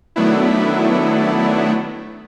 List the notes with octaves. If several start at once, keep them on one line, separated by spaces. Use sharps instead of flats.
D#3 F#3 A3 B3 D4 E4